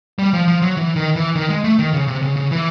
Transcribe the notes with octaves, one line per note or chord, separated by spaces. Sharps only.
G3
F3
F3
F#3
E3
D#3
E3
D#3
G#3
A3
D#3
C#3
C3
C#3
C#3
E3